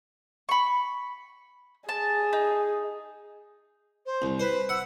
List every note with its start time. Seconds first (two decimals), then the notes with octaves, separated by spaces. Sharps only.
0.49 B5 C#6
1.89 G#4 A5
2.33 D#4
4.06 C5
4.22 C2
4.39 B4 C5
4.69 F#5 E6